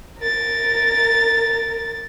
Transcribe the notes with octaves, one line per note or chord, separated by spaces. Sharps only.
A#4 A6